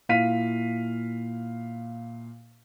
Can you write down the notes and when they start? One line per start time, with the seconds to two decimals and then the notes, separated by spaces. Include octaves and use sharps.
0.09 A#2 E4 F5 B6 D#7